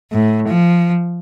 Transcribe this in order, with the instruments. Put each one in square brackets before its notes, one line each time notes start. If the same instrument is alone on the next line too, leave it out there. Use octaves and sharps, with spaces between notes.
[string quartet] A2
F3